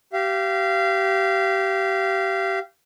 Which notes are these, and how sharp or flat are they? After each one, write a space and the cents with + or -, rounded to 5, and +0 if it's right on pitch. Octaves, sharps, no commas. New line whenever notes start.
G4 -20 F5 -30